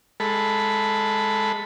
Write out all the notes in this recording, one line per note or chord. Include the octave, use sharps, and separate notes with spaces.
G#3 A4 B5